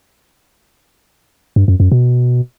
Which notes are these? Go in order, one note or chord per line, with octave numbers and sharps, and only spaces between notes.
G2
F#2
F#2
B2